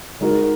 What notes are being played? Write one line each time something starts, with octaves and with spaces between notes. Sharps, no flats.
G#3 D#4 F#4 A#4